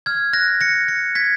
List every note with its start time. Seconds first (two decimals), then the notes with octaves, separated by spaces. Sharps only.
0.06 F6 G#6
0.33 F#6 A#6
0.61 A#6 C#7
0.88 A#6 C#7
1.15 G#6 B6